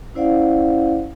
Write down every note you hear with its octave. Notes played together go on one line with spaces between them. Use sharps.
C#4 E4 C5 D5 F5 F#5